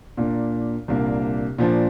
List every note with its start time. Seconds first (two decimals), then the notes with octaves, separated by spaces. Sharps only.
0.17 A#2 A#3 D4
0.88 C2 A#2 A#3 D4
1.58 A#2 F3 D4